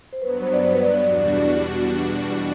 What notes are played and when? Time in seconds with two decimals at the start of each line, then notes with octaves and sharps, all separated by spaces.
0.13 C5
0.22 G2 F#3 B3 B4
0.42 C5
0.53 D5
0.63 C5
0.73 B4
0.82 D5
0.93 D5
1.03 E2 B2 G3 D4 F#4